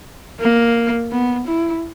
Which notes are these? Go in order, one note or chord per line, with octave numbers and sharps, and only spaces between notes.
A#3
B3
E4